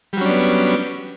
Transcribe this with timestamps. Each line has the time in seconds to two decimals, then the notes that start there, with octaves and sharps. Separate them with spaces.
0.13 G3
0.17 F#3
0.21 C#4
0.25 D4
0.29 B3